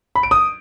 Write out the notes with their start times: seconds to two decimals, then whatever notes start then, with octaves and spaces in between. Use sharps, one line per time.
0.15 B5
0.23 D7
0.31 D#6